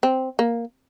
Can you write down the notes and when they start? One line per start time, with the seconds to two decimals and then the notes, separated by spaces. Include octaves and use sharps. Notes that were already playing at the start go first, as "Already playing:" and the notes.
0.03 C4
0.39 A#3